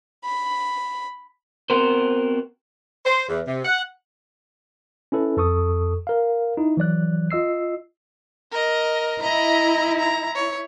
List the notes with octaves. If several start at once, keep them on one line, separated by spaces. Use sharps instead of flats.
B5
B3 C4 F#4 A#4 C5
C5
E2
C3
F#5
C#4 E4 A4 B4
F2 A4 C#6 D#6
A#4 F5
D#4 E4
E3 F#3 D5 F#6
F4 D#5 E6 C7
A#4 D#5
E4 D#5 A#5
A#5
C#5